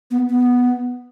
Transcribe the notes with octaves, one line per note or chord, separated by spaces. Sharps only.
B3
B3